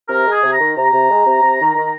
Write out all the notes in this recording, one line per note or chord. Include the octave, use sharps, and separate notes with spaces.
C3 A#4
G#3
G#4
C3
A#5
D#3
C3 A#5
C3
G#3
C3
C3
D#3
D#3